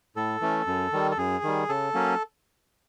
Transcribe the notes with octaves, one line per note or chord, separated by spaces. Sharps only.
A2 A4
E3 A3 C#4
F#2
D#3 G3
A4
F#2 G#4
D#3 G3
C#3 A4
F#3 A#3 C#4